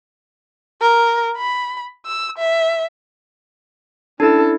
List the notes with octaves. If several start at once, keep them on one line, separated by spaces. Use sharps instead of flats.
A#4
B5
E6
E5
C#4 D4 E4 A4